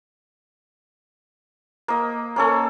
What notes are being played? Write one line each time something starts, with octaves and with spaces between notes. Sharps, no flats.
A#3 D#5
A#3 C#4 A4